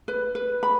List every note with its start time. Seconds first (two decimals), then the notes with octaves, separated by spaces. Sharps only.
0.08 B4
0.35 B4
0.63 B5